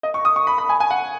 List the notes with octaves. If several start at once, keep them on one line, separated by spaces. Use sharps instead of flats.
D#5
C#6
D#6
C#6
B5
B5
G#5
G#5
F#5